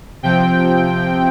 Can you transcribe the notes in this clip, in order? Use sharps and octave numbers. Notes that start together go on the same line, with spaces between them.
C3 F3 C4 G5